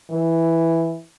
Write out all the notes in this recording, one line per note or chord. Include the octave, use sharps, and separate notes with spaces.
E3